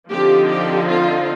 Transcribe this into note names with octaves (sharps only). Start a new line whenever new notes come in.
D3 F3 C4 D#4 G4
G4
F4